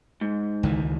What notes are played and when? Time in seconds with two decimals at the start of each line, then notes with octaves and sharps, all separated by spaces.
0.21 G#2
0.63 C#2 D#3 E3